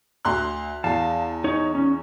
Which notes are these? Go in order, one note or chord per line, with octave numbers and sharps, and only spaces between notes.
D2 C6 F#6
E2 F5 A5
D#4 C#5
C#4